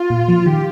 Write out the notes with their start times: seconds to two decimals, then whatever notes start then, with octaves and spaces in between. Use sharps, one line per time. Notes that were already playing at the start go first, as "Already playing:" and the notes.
Already playing: F4
0.10 A#2
0.28 F3
0.46 D#3 G4